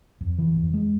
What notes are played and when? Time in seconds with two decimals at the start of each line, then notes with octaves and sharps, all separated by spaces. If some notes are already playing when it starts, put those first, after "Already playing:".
0.21 F2
0.38 E3
0.56 F2
0.73 G#3